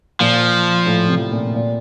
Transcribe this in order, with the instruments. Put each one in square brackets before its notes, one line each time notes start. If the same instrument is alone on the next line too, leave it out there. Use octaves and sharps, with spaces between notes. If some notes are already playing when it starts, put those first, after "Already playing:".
[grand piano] A#2 [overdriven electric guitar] F3
[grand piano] A2
C3
A#2
A#2